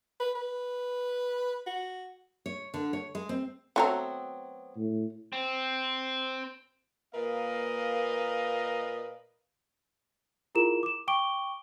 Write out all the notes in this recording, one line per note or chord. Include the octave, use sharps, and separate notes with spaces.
B4
B4
F#4
C#5
D3
C#5
G#3
C4
F#3 A3 B3 C4 F#4 A#5
A2
C4
A#2 A#3 A#4 B4 D#5 F5
E4 F4 G#4 A#4 A#5 E7
D6 E7
G5 C#6 D6 D7 G7